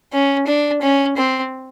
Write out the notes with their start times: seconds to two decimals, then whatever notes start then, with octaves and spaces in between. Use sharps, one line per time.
0.13 C#4
0.47 D4
0.82 C#4
1.17 C4